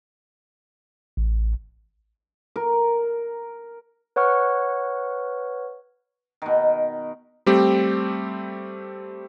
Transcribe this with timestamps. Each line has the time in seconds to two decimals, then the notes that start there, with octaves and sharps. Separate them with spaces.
1.17 A1
2.56 A#4
4.16 B4 C#5 F#5 C#6 F6
6.42 B2 D#3
7.46 G3 A3 C4 G4